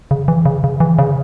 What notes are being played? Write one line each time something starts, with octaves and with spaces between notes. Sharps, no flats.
C#3
E3
C#3
C#3
E3
C#3